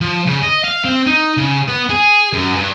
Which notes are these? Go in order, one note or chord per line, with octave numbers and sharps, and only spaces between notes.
F3
C#3
D#5
F5
C4
D#4
C#3
B3
G#4
F#2
G2